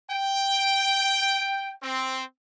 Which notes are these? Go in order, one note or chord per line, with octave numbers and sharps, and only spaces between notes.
G5
C4